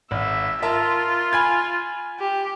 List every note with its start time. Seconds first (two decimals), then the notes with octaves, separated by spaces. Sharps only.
0.11 G#1 E5
0.62 F4 A#4 E5 A5
1.33 G#5 B5 G#6
2.19 G4